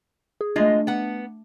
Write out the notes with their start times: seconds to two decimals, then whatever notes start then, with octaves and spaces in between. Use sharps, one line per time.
0.41 G#4
0.56 G#3 A3 D4 F4 D#5
0.87 B3 F#5